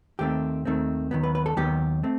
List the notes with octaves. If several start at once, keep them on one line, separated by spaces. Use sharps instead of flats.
D#2 D#3 A3 C4 G4
D#2 D#3 A3 C4
D#2 D#3 F#3 B3
B4
B4
A4
D#2 D#3 F#3 B3 G4
A3 C4